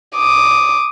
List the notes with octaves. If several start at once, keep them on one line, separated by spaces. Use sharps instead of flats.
D6 D#6